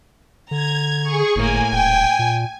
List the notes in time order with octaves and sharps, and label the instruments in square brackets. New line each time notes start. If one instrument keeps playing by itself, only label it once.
[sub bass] D3 [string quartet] A#5 [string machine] G#6
[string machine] G#4 C#6
[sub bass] G1 [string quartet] A2 A#3 [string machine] G#5
[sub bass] D#1 [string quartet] G5
[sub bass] A#2